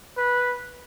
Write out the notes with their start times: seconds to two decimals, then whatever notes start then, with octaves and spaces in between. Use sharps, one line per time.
0.17 B4